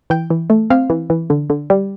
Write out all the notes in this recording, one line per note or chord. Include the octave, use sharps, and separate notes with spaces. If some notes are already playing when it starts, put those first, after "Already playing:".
E3 G5
E3
A3
C4 F5
E3
E3
D3
D3
G3